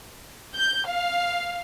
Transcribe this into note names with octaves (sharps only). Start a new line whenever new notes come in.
G6
F5